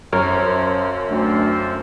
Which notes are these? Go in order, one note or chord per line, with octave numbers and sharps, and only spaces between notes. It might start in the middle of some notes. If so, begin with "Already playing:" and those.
F#2 F3 A#4 C#5
D2 E3 F3 C4